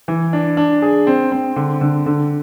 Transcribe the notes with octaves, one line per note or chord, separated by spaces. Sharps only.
E3
D4
D4
G#4
C4
C4
D3
D3
D3